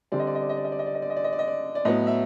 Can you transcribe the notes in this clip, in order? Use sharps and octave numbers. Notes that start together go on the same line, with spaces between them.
D3 G3 C4 D5
D#5
D5
D#5
D5
D#5
D5
D#5
D5
D#5
D5
D#5
D5
D#5
D5
D#5
D5
D#5
D5
D5
A2 F#3 B3 D#5
E5